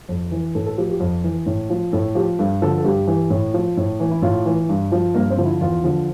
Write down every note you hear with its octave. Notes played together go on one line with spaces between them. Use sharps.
F2
E3
A2 A4
A4
F3 G4
G4
F2
E3
A2
F3
A2 A4
F3 G4
G2 A4
D3 F3 A4
A4
G2 G4
E3
A2
F3
A2
E3
E4
A2 F4
E3
G2
F3
G2 A#3
C4
D3 F3
E4
E2 F4
D3 F3